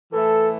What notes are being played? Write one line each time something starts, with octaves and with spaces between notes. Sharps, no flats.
A2 E3 A3 A4